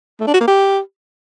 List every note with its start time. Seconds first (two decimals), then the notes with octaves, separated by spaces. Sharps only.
0.20 A3
0.27 D4
0.34 F#4
0.41 A#3
0.48 G4